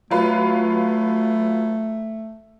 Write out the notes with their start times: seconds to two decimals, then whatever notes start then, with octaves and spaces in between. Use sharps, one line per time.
0.11 F#3 A3 F4 B4